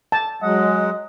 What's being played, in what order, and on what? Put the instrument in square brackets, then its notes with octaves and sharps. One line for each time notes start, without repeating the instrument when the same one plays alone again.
[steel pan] A5
[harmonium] F#3 G#3 F#5 [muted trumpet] D#5